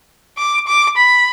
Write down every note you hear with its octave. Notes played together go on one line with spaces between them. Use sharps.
D6
D6
B5